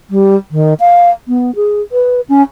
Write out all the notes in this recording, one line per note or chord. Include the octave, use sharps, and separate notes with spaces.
G3
D#3
F5
B3
G#4
B4
C#4